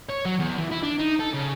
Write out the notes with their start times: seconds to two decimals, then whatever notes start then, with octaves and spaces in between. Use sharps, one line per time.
0.10 C#5
0.26 F#3
0.40 E2
0.58 E3
0.71 E4
0.83 D4
0.99 D#4
1.19 A4
1.33 C#3